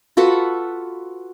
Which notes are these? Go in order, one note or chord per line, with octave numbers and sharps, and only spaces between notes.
F4 F#4 A4 B4